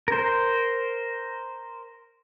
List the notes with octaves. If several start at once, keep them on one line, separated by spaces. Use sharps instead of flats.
A#4 C5